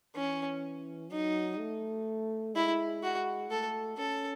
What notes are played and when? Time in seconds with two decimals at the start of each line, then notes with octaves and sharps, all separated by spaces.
0.15 E3 C#4
1.11 F#3 D#4
1.59 A3
2.54 G#3 E4
3.03 F#4
3.50 A3 A4
3.98 C#4 A4